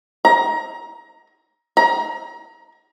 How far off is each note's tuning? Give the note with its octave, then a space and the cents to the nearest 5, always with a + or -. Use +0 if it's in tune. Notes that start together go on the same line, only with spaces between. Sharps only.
A#5 +25
A#5 +30